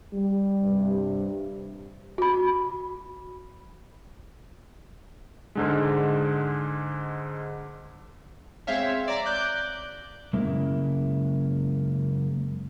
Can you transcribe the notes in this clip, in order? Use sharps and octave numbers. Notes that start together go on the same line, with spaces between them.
G3
G2 C3
F#4 B5
G#2 D3 G#3
G#3 C4 C#5 E5 F5
D5 A#5
D6 F#6 G6
F#2 C#3 G#3 A#3 E4 E5